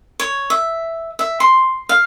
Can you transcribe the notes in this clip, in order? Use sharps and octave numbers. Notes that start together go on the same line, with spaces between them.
C#5
E5
E5
C6
F5